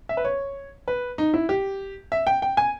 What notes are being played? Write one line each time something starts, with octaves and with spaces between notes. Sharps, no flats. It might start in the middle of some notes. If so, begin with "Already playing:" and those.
E5
B4
C#5
B4
D#4
E4
G4
E5
G5
G5
G#5